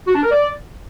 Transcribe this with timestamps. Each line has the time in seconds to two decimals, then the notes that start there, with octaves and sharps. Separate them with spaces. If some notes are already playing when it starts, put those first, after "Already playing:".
0.07 F#4
0.15 D4
0.23 A#4
0.31 D5